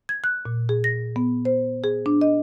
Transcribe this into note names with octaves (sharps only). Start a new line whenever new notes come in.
G#6
F#6
A#2
G#4
A#6
B3
C5
G#4
D4
D#5